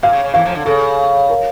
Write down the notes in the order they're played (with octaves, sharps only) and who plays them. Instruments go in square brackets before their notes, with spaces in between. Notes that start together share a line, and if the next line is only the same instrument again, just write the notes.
[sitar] A#2 [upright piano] F5
[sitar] C#3
C#3
[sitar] E2 E3 [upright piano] F5
[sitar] F2 F3
D3
[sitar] C#3 [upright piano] A4
[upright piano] A#4